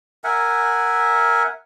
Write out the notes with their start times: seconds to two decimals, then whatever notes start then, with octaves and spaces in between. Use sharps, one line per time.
0.24 A#4 E5 F#5 G#5